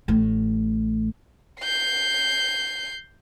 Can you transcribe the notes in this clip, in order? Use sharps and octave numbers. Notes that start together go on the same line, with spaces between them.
A1 A2
G6 C7